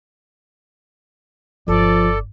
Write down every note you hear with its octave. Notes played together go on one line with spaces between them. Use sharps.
G1 F3 A4 D5